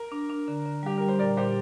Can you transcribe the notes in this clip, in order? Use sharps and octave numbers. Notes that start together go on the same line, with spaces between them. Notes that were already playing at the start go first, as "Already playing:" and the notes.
Already playing: A#4
D4
D4
D3
D3
G3 G4
G3 A#4
C5
A#2 A#4 D5
A#2 G4 C5